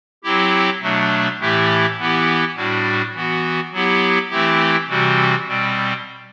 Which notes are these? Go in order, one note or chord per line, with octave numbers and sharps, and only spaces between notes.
F#3 C4 E4 G4
B2 F#3 A3 D4
A2 E3 A3 E4 G4
E3 B3 E4 G4
A2 G3 D4 F#4
E3 B3 F#4
F#3 B3 E4 G4
E3 A3 C4 E4 G4
C3 E3 G3 C4 F#4
B2 G3 C4